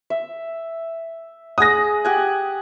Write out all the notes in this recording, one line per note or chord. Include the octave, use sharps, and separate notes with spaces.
E5
G#4 F#5 D#6 A#6
G4 F#5 G#5